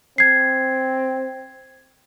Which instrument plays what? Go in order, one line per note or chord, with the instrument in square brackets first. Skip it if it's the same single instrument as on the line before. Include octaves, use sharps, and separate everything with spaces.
[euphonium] C4 [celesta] G#6 C7